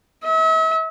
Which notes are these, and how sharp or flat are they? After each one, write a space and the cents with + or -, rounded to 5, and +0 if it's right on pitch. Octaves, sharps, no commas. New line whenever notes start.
E5 -40